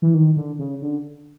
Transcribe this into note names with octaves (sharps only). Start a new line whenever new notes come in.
E3
D#3
D3
C#3
D3